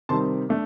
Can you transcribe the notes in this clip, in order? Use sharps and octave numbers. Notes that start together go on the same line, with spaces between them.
C3 D#3 G3 C4 D#4 A5 C6
A3 D4